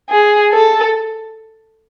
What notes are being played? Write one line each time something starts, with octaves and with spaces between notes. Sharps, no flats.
G#4
A4